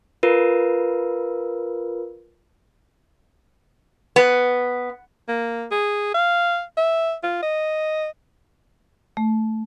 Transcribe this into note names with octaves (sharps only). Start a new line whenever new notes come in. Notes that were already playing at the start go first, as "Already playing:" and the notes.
F4 A#4 B4
B3
A#3
G#4
F5
E5
F4
D#5
A3